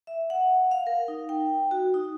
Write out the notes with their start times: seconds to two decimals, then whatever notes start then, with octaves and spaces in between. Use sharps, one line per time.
0.07 E5
0.30 F#5
0.71 F5
0.87 A#4
1.08 D#4
1.29 G5
1.71 F#4
1.94 D#4